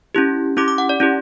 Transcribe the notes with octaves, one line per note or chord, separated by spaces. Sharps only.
C#4 E4 G4
C#4 E4 G4 D6
D6
F#5
D5
C#4 E4 G4